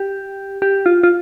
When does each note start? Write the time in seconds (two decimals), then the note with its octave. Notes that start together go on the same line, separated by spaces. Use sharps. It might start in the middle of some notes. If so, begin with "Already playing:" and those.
Already playing: G4
0.62 G4
0.86 F4
1.03 F4